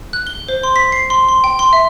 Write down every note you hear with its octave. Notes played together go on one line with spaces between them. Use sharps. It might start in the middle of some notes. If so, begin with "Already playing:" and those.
F#6
G7
C5
C6
B6
C7
C6
C6
G5
C6
E5